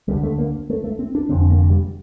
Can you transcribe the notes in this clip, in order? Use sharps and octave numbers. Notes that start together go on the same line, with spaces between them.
D2 D3 G3
A3
A#3
A3
A3
C4
D4
F1 F2 D3 C4
A#3
G3